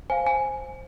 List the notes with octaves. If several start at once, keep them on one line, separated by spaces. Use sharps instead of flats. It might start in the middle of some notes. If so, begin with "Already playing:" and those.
C5 F5 G#5
G#5